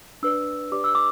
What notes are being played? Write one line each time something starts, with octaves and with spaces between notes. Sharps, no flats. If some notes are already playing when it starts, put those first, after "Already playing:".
D4 B4 D5 E6
D4 G4 B4 D5 D6
E6
D6